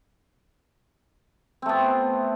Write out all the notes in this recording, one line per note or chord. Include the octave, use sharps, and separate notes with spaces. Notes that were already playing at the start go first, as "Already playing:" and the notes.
A3 B3 C4